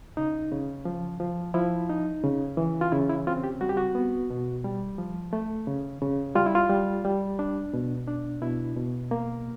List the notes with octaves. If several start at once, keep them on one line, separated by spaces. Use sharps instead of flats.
C#3 D#4
C#3
F3
F3
F3 E4
D#4
C#3
E3
F4
C#3 E4
E4
C4 F4
G4
G3 F#4
G4
F#4
B3
B2
G3
F3
A3
C#3
C#3
G3 F4
E4
F4
G3
G3
D4
B2
D4
B2 E4
B2
A#3